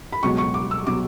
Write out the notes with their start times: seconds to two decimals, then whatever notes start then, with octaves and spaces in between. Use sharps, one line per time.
0.12 B5
0.23 C#2 B2 F#3 C#6
0.38 C#6
0.54 D6
0.71 E6
0.87 B2 F#3 D6